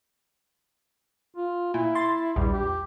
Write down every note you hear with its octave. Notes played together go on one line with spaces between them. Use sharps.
F4
A#2 E4
C6 A6
A#1 E2 G3
G4